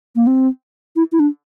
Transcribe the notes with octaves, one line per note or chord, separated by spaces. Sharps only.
A#3
C4
E4
E4
D4